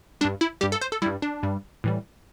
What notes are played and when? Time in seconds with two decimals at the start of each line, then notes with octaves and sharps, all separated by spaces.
0.21 G3 D4
0.25 G2
0.41 E4
0.61 G2 G3 G4
0.72 A4
0.81 C5
0.92 A4
1.02 G2 G3 E4
1.22 D4
1.43 G2 G3
1.84 A2 E3 G3